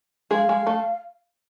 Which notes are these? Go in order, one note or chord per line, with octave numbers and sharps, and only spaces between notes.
G#3 G#4 F5
G#3 G#4
A3 A4